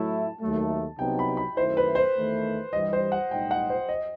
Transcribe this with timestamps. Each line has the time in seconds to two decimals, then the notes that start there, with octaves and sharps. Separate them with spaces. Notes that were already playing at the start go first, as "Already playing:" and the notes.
Already playing: A2 F#3 A3 E4 A5
0.42 D#2 D#3 F#3 A3
0.99 C2 C3 F#3 B3 D#4 G5
1.19 B5
1.37 B5
1.57 F#2 D#3 A3 E4 C5
1.77 B4
1.95 C5
2.15 E2 D#3 A3
2.72 G2 E3 G3 D#5
2.93 C5
3.12 F#5
3.31 B1 A2 G3 D#4 G5
3.51 F#5
3.70 C5
3.89 D#5